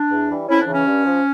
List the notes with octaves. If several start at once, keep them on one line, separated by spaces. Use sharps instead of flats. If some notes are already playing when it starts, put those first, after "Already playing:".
Already playing: D4
E2
E3 G3
F2 C#4 E4
D4
C#3 E3
C#4
G2
F3